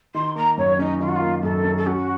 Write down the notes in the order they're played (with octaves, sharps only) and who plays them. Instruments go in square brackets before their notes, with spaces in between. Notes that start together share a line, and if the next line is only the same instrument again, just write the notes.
[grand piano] D#3 [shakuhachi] C6
[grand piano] A#3 [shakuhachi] A#5
[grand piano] F#2 [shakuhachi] C#5
[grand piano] C#4 [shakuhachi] D#4
[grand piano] D#3 [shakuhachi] F4
[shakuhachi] F#4
F4
[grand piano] A#3
[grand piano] F#2 [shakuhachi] A4
[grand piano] C#4
[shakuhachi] A4
[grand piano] C#4 [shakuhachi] F#4